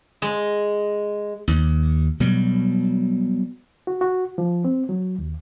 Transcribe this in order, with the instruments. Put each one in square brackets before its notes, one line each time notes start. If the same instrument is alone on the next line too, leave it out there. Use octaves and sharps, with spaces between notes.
[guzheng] G#3
[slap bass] D#2
B2 F#3 G3
[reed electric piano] F#4
F#4
F3
C4
F#3
D#2